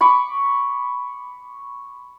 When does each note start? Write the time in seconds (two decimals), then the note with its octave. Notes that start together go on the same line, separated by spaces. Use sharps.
0.01 B5 C#6 D6